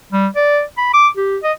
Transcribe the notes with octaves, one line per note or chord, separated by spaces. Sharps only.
G3
D5
B5
D6
G4
D#5